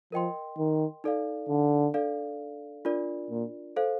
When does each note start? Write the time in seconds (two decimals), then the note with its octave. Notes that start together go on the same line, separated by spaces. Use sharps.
0.12 F3 A#4 D#5 G5 C6
0.58 D#3
1.04 D#4 A4 D5 F5
1.49 D3
1.94 D4 A4 D5 F5
2.85 D4 F4 A#4 D5
3.30 A#2
3.76 A4 C5 F5